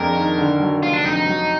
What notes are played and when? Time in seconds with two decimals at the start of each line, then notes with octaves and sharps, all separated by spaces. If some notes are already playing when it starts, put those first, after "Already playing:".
Already playing: F2 G#3 D4 A#4
0.16 D#3
0.38 D3
0.60 F#3
0.82 F1 F4
0.93 D4
1.04 F2 D#4
1.16 D#4
1.26 F#3